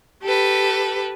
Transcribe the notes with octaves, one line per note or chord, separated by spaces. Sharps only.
G4 A4 B4